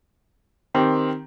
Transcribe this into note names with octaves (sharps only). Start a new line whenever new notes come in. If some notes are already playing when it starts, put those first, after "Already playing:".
D#3 C4 G4